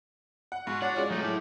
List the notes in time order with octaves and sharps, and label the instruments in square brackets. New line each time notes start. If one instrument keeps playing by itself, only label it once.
[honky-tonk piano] F#5
[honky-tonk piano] G#2 [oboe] F#4
[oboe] D4 [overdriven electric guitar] F#4 [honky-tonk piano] C#5 F#5
[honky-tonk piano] G#3 C#4 F4 [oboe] D5
[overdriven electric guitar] F#3 A3 [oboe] D#4
[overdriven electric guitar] E4 A4 [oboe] G4